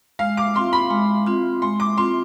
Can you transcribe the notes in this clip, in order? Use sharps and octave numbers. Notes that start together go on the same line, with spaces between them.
G#3 F5
D6
C4 F4 C6
B5
G#3
C4 F4
G#3 C6
D6
C4 F4 C6